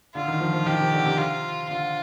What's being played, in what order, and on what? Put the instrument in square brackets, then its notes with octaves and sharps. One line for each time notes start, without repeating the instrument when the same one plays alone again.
[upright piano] D3 [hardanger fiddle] F4
[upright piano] D#3
F3
F3
[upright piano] D#3 [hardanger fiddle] G4
[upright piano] C3
D3
C3
[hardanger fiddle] F4
[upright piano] D3 [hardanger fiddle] F4